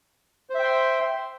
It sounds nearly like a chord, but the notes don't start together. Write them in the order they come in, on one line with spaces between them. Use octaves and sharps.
C5 E5 G5 C6